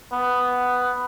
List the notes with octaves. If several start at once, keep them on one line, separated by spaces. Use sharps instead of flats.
B3